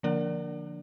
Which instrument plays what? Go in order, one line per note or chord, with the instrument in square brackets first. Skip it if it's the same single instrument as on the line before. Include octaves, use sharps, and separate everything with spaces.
[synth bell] D3 F3 A#3 D4 A#4 D5